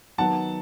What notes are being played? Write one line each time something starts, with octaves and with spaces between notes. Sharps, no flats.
D#3 F#3 B3 F#5 A5